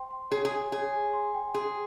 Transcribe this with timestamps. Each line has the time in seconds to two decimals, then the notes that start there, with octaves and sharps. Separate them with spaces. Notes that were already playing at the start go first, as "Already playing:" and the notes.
Already playing: C5 G5 C6
0.11 C6
0.31 G#4 C#5
0.45 G#4
0.52 G#5
0.72 G#4 C#5
0.93 G#5
1.13 C6
1.34 G5
1.54 G#4 C6